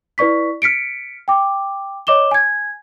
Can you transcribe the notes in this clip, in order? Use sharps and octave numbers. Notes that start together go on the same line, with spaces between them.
E4 B4 D5 C#6 B6
F6 B6 C#7 D7
G5 D6
C#5 D#5 D6 E7 G7
G#5 G#6